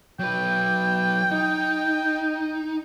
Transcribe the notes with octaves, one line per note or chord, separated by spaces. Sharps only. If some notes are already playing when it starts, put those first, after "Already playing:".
F#3 B4 G5
D#4